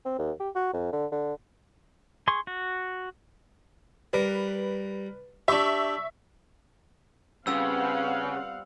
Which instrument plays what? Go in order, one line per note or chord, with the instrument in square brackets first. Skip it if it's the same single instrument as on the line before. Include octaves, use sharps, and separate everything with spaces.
[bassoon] C4
D#2
G4
F#4
F2
D3
D3
[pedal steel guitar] G#4 C6 C#6
F#4
[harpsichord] G3 A#4 [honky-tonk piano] B4
[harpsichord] D4 G4 [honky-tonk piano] E5 C#6
[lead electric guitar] C#3 [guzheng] G3 B3 F4 [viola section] C4 F5 F#5 [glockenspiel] E6